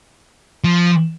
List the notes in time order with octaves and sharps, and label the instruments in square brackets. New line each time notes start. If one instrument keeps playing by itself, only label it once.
[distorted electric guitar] F3